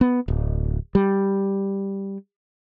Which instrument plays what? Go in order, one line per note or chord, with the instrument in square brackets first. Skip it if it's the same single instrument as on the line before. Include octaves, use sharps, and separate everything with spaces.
[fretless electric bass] B3
D1
G3